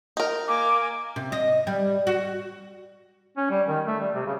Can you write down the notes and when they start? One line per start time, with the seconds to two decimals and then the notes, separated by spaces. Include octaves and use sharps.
0.17 D#4 A#4
0.48 A#3 G#5 D6
1.16 C3
1.32 D#5
1.67 G3
2.07 F#4
3.37 C#4
3.50 G3
3.68 D#3
3.86 A3
4.00 G3
4.15 C3
4.26 C#3